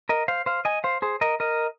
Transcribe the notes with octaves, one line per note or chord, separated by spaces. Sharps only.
A#4 D#5
C5 F5
C5 F5
D#5 G#5
C5 F5
G#4 C5
A#4 D#5
A#4 D#5